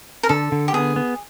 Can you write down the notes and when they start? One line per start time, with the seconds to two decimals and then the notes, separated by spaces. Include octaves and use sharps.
0.23 A#4
0.29 D3 A4
0.52 D3
0.68 G4
0.73 B3 G#4
0.96 B3